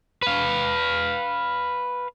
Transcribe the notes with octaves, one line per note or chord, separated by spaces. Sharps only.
B4 F5